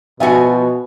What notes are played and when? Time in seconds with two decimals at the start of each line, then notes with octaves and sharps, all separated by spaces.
0.20 B2 F3 F#4 E5 G#5